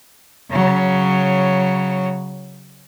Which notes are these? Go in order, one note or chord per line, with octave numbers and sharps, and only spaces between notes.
C#3 F#3